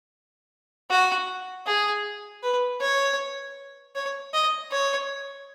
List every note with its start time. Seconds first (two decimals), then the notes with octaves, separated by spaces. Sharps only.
0.90 F#4
1.66 G#4
2.43 B4
2.81 C#5
3.95 C#5
4.33 D#5
4.71 C#5